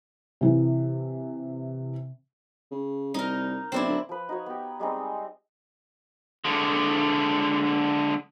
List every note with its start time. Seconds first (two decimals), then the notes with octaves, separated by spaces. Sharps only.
0.41 C3 E3
2.71 C#3
3.14 C2 D#4 A#4
3.72 B1 C4 D4 E4
3.87 D1
4.09 F3 B4
4.29 D#4 F#4 C#5
4.46 B3 G4
4.80 G3 G#3 C4 D#4
6.45 D3 G#3